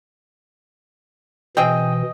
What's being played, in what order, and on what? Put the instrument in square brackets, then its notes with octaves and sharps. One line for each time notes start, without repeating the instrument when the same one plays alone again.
[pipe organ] B2 E3 [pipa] C4 G#4 G5 [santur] D#5